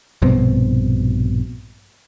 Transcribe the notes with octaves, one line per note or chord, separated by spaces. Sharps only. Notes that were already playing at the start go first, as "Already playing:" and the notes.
A#1 G2 B2 C4